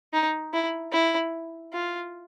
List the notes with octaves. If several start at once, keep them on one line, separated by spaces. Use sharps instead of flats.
D#4
E4
E4
F4